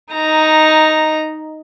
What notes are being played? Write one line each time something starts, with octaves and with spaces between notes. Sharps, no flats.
D#4 A#5